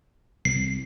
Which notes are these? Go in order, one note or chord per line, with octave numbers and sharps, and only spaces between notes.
C2 C7